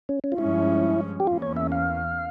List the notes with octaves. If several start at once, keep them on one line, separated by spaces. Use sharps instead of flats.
C#4
C#4
F4
G2 F3 G#3 C#4 E4
G4
E2 E3 A#3 C#4 F4
C#5
E5
F5